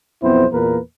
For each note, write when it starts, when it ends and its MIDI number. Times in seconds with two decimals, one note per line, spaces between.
0.23 0.46 35
0.23 0.46 41
0.23 0.46 59
0.23 0.46 60
0.23 0.46 64
0.23 0.46 72
0.52 0.78 40
0.52 0.78 46
0.52 0.78 58
0.52 0.78 70
0.52 0.78 71